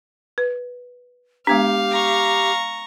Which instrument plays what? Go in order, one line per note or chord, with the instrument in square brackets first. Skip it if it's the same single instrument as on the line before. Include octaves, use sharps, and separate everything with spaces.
[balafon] B4
[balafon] G#3 B3 D4 [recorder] G4 [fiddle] F5
[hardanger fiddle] A#5 C#6